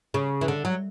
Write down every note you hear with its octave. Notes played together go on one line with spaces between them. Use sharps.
C#3
E3
D3
F#3